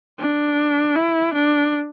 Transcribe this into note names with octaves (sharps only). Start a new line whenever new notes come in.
D4
E4
D4